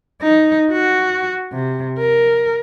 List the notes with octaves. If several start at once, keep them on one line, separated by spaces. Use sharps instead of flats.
D#4
F#4
C3
A#4